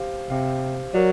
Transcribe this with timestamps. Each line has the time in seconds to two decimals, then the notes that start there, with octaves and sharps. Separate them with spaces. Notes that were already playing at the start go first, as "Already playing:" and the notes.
Already playing: G4 C5 F5
0.30 C3 G4 C5 F5
0.94 F#3 A#4 D5